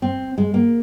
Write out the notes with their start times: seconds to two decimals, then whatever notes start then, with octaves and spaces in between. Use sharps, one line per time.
0.02 C4
0.38 G#3
0.54 A#3